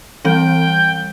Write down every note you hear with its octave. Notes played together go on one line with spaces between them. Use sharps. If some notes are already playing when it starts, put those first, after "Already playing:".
E3 G3 C4 G5